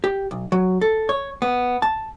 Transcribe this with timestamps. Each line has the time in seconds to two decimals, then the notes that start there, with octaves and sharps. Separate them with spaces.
0.04 G4
0.31 B1
0.52 F#3
0.81 A4
1.09 C#5
1.42 B3
1.82 A5